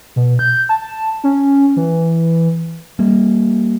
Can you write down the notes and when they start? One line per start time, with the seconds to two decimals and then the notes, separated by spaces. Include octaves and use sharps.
0.16 B2
0.39 G6
0.69 A5
1.24 C#4
1.76 E3
2.99 G3 A#3